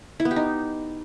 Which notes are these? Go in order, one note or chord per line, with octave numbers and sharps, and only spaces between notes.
E4
B3
G4
D#4